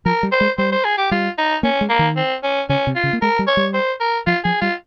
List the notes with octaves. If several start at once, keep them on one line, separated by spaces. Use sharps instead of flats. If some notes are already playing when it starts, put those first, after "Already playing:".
F3 A#4
G3
C5
G#3
G3 C5
C5
G#4
G4
G3 F4
D#4
A#3 C#4
G#3
A#3
D#3
C4
C#4
C#3 C#4
C3
F4
C#3
A#3
G#3 A#4
G3
C#5
G3
C5
A#4
F3 F4
F3 G#4
G3 F4